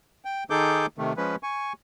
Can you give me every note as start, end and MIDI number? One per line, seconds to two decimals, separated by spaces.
0.25 0.44 79
0.50 0.86 51
0.50 0.86 63
0.50 0.86 68
0.50 0.86 69
0.50 0.86 86
0.50 0.86 91
0.98 1.13 48
0.98 1.13 51
0.98 1.13 57
1.17 1.36 53
1.17 1.36 56
1.17 1.36 61
1.17 1.36 71
1.43 1.73 80
1.43 1.73 85